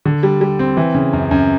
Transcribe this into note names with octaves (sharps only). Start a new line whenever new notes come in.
D3
G3
G3
C4
E3
C#3
F#2
F#2